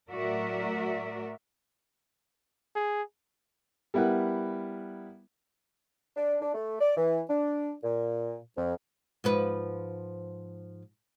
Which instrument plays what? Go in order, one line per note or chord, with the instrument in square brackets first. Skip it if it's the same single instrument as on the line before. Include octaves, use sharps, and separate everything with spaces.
[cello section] A2 F#3 F#4 A#4 D5 E5
[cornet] G#4
[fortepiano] G3 B3 E4 A#4 F#5
[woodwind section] D4
D4
A3
D5
E3
D4
A#2
F2
[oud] G#2 F3 B4